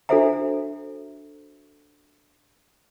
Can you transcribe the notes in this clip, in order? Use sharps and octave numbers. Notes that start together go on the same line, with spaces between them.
D4 F#4 A4 C5 E5 A#5